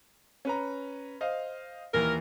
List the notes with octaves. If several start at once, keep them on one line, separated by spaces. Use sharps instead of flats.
C#4 B4 A#5
C5 D#5 F5
D#2 E3 A#4